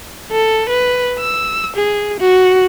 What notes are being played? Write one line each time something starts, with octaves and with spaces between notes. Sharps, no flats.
A4
B4
E6
G#4
F#4